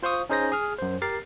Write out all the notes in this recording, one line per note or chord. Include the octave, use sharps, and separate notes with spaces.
F4 C5 F5 C#6 D#6
C#4 D#4 G#4 C5 G6 A#6
G#4 F6
F#2 C5
G4 A#4 F6 A6 C7